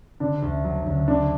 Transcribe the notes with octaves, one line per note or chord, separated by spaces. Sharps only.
D3 D4
D2
F#3
D2
D3 D4